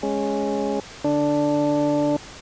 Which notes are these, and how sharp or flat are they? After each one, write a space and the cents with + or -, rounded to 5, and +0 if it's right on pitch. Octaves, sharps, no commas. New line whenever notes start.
G#3 +0 C#4 +0
D3 +0 D4 +0